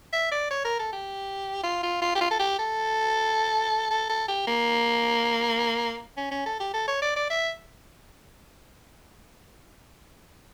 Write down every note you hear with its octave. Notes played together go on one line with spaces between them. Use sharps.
E5
D5
C#5
A#4
A4
G4
F4
F4
F4
G4
F4
A4
G4
A4
A4
A4
G4
A#3
C#4
C#4
A4
G4
A4
C#5
D5
D5
E5